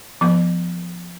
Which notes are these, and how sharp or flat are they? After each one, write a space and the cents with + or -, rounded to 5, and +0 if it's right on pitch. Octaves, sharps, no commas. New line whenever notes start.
F3 +0 B3 +0